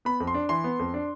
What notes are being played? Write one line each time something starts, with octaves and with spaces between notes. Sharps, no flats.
B3 B5
F2
C6
D4
E3 C6
B3
F2
D4